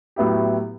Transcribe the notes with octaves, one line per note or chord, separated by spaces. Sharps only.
A2 F#3 B3 E4 G4